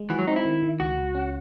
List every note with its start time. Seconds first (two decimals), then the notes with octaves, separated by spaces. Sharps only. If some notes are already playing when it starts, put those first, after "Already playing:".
Already playing: G#3
0.10 E3 F#4
0.19 F#3
0.27 C4 D#4
0.36 E4
0.45 D#3
0.63 D#3
0.80 C#2 F#4
0.98 C#2
1.15 C#4